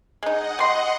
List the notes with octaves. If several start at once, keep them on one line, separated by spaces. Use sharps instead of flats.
G#3 D#4 D#5 F#5
G3 C6